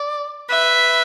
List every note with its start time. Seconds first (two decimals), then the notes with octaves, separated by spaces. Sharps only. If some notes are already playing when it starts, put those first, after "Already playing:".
Already playing: D5
0.50 B4 E5